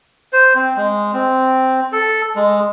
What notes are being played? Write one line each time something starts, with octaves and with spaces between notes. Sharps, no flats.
C5
C4
G#3
C4
A4
G#3